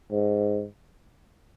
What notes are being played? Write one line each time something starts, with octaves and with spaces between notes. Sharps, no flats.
G#2